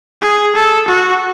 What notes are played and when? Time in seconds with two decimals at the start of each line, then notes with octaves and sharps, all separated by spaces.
0.22 G#4
0.55 A4
0.88 F#4